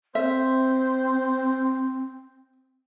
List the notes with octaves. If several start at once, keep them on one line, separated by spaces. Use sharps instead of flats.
C4 C5 E5